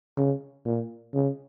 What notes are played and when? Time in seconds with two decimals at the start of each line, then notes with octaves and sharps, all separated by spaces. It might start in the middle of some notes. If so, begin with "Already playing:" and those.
0.17 C#3
0.66 A#2
1.14 C#3